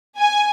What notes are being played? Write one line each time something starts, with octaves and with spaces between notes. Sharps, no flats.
G#5